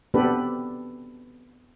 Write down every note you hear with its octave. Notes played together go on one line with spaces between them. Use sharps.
B3 C4 D4 G4 A4 B4